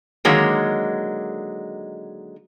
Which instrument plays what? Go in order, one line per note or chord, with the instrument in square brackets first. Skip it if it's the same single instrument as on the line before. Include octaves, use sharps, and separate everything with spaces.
[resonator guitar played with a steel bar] D3 D#3 F#3 G#3 A#3